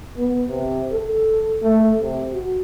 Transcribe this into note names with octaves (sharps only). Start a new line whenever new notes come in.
B3
C3
A4
A3
C3
F#4